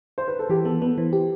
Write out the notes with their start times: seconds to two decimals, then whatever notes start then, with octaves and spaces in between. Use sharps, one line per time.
0.18 C5
0.28 B4
0.39 A4
0.50 E3 G4
0.65 B3 A4
0.82 B3 B4
0.97 E3 C5
1.13 G4